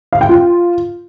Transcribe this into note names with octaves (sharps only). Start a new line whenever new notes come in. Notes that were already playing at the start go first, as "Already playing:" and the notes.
F5
G5
F4